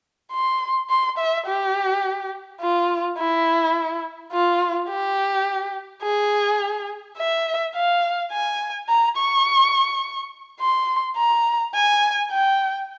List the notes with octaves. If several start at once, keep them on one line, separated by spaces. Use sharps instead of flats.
C6
C6
E5
G4
F4
E4
F4
G4
G#4
E5
F5
G#5
A#5
C#6
C6
A#5
G#5
G5